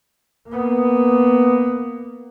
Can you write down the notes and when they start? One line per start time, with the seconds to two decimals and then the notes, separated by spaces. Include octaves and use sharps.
0.48 A#3 B3